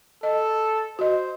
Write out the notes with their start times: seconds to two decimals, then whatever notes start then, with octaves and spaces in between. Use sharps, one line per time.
0.23 A4 D#5
0.99 F#4 C5 D#5